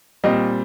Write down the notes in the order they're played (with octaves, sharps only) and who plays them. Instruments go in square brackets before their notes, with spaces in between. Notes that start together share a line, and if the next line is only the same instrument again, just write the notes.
[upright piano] A#2 G3 C4 D#5